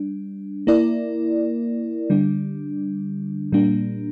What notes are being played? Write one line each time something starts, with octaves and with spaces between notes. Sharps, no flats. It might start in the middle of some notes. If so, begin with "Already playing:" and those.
Already playing: G3 D4
A#3 E4 A#4 D5
D3 G3 D4
A#2 G3 A#3 D4